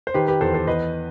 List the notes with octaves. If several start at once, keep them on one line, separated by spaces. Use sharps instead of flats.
C5
D#3 G4 B4
G4 B4
E2 A4 C5
A4 C5
E2 B4 D#5